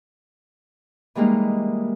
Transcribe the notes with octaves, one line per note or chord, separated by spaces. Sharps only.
E3 G3 G#3 A#3 D#4